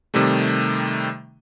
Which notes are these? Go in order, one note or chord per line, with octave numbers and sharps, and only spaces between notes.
C3 D#3 G3 A3